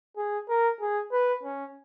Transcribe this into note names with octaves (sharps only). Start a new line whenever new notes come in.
G#4
A#4
G#4
B4
C#4